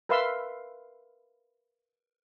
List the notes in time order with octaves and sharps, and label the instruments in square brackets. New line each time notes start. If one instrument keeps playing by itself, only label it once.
[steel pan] A#4 B4 E5 F5 C6 E6